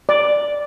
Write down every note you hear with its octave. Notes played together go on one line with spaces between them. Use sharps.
D5